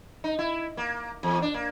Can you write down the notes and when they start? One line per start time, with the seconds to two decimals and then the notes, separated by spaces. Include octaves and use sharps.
0.24 D#4
0.39 E4
0.77 A#3
1.23 E2
1.42 D4
1.54 A#3